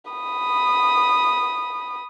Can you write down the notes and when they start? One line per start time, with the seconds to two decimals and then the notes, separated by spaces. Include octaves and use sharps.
0.11 B5 D#6